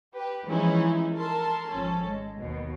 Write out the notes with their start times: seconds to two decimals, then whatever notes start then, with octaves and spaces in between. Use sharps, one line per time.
0.14 G4 B4
0.45 E3 F3 G#3 C#4 D#4 E4
1.16 A4 A#4 A5 C6
1.71 G#1 F3 C#4 A4
2.08 G#3
2.39 D#2 B2